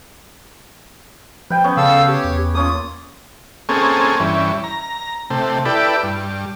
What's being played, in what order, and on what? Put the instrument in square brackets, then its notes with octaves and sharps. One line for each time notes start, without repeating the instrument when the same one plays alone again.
[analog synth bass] F3 [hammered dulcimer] B4 G5
[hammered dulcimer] B3 C#4
[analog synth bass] C#3 [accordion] A4 F5 E6
[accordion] G4 C#5
[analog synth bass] E2
[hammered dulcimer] A#3 C#4 F4 [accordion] D#6
[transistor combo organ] A#3 C4 C#4 G#4 A4
G2 E3 C#4
A#5
C3 A3
E4 G4 A4 B4 D5
G2